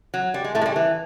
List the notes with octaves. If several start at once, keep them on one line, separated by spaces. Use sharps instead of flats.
F#3
G3
G#3
A2 A3
G#3
G3
E3